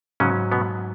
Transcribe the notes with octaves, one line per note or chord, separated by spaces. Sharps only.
G#2 C#3 F#3 C#4
B2 B3